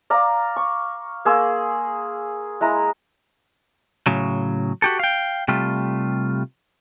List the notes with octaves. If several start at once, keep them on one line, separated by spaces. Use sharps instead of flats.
D5 F5 A#5
C#6
A#3 G#4 C6 E6
G#3 E4 A#5
A2 C#3 F#3
F#4 G4 A4
F5 G5
C3 G3 A3 F4